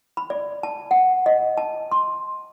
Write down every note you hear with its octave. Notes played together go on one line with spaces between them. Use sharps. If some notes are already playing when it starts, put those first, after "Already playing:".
B5
D5
A5
F#5
D#5
A5
C6